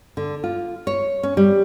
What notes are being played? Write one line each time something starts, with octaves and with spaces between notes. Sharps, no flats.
D3
F4
C#5
C#4
G3